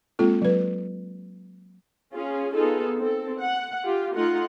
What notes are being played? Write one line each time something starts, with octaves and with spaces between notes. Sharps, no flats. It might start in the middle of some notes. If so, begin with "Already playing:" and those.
G#3 A#3 C4 F4 A4
F#3 B4
C#4 F4 G#4
B3 D#4 F4 G#4 A4
C4 A4
F#5
F4 G4
A3 D#4 F4 F#5